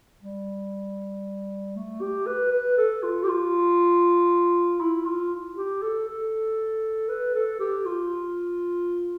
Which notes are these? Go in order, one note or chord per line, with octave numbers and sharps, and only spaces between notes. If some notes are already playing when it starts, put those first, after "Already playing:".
G3
A3
G4
B4
B4
A4
F4
G4
F4
E4
F4
G4
A4
A4
B4
A4
G4
F4